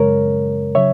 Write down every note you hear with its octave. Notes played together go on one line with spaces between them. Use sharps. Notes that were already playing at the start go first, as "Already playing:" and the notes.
Already playing: F#2 C#3 G#3 A#4 C#5
C#3 F#3 C#5 E5